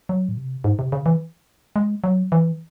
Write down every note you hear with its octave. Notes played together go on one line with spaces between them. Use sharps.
F#3
A2
C3
G#2
C3
C#3
E3
G#3
F#3
E3